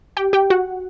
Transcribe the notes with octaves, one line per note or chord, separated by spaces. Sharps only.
G4 G5
G4 G5
F#4 F#5